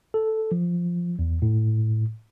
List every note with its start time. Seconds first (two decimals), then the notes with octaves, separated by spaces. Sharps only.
0.14 A4
0.52 F3
1.19 E2
1.42 A2